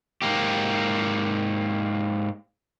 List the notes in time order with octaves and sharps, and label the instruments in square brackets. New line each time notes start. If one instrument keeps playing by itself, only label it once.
[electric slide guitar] G#2 A#3 G4